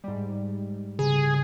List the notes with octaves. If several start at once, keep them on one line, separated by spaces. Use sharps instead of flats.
G#2 G3
C#3 G#4